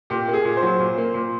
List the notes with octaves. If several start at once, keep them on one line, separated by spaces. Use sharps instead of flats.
A#2 G4
A#3
G#4
A#2
C5
F#3
A#2
A#3
A#2